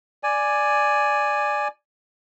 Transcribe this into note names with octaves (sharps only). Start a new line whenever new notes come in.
D5 G#5